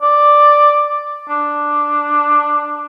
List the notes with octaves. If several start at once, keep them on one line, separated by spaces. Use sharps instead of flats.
D5
D4